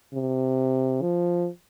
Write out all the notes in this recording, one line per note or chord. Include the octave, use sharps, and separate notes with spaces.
C3
F3